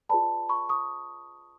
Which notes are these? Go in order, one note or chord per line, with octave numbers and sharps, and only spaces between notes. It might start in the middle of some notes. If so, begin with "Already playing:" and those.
F4 G#4 B4 D5 A5 B5
B5 C#6
C#6 D#6